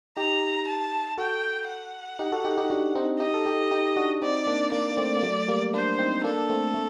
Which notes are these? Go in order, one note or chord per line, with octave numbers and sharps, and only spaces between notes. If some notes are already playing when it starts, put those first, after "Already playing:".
D#4 G4 A#5
A5
F#4 A4 G5
F#5
D#4 G4
F#4 A4
D#4 G4
D#4 G4
D4 F#4
C4 D#4
D#4 G4 D#5
A4
D#4 G4
D#4 G4
D4 F#4
C4 D#4 D5
A#3 D4
A#3 D4 D5
A#3
A3 C4
A#3
F#3 A3
G3 A#3
A#3 D4 C5
C4 D#4
A#3 D4 A4
A3 C4
A3